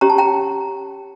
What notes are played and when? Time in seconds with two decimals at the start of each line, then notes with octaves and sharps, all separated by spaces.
0.01 C#4 G4 C#5 A#5
0.10 A5
0.18 G5 A#5